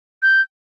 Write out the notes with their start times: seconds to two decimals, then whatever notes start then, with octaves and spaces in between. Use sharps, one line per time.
0.23 G6